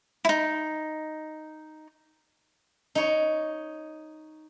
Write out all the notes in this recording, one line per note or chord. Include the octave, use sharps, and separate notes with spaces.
D#4 E4
D#4 C#5